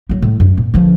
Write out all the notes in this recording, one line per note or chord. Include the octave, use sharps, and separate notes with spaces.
F#3 A#3
A2
F#2
A#2
D3 F3